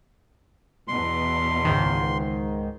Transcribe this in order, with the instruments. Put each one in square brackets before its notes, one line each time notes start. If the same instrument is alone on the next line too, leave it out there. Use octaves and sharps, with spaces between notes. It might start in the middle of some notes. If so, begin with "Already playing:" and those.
[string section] E2 B2 [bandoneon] C6
[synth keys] C#2 G#2 D#3